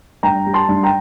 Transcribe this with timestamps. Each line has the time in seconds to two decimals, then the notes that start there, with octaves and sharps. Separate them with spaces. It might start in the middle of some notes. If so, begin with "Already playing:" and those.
0.23 G2 G5 A#5
0.46 G3
0.54 A5 C6
0.69 G2
0.83 G5 A#5